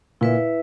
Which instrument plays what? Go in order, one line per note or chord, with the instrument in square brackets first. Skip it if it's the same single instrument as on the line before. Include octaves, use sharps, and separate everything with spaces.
[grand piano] A#2 [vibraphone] E4 B4 E5